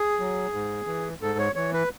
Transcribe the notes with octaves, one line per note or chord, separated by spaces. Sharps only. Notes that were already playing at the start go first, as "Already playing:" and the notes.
Already playing: G#4
F#3
G#2
E3
G#2 A4
C#5
E3 C#5
B4